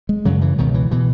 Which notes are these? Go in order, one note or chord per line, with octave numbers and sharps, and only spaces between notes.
G#3
F#2 C#3 F#3
E3
C#2 B2 D#3
E3
B2 E3